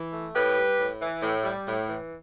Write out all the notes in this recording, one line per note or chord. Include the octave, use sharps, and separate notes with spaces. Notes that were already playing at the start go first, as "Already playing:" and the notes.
Already playing: E3
A3
A2 G4 B4
G3
A2
E3
A2
G3
A2
E3